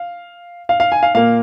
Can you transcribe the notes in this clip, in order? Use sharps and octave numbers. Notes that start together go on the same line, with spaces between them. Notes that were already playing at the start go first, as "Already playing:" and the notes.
Already playing: F5
F5
F5
G#5
F5
A#2 A#3 F5